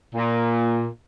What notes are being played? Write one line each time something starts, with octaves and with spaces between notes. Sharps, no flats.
A#2